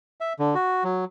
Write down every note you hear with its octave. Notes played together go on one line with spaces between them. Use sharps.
E5
D3
F#4
F#3